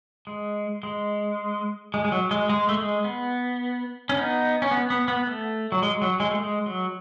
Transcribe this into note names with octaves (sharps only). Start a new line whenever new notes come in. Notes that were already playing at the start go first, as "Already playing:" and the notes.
G#3
G#3
G#3
G#3
F#3
G#3
G#3
A3
G#3
B3
C#4
B3 D#4
C#4
B3
B3
B3
A3
F#3
G#3
F#3
G#3
A3
G#3
F#3